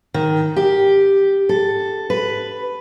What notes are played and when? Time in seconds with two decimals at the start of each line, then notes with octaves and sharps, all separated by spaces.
0.14 D#3
0.56 G4
1.49 A4
2.10 B4